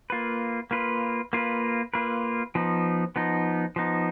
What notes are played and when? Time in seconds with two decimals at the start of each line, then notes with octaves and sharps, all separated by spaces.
0.10 A#3 F4 B4
0.71 A#3 F4 B4
1.33 A#3 F4 B4
1.94 A#3 F4 B4
2.55 F3 B3 D#4
3.16 F3 B3 D#4
3.76 F3 B3 D#4